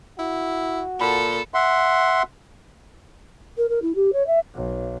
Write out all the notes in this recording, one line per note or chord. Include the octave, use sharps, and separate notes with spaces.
E4 F#4
A#2 A4 A5 B5
E5 F#5 C6
A#4
A#4
E4
G4
C#5
E5
B1